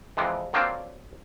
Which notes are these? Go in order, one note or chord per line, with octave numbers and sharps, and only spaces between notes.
F2 C3 E3 G#3
D3 F#3 A#3 C4 D4 F4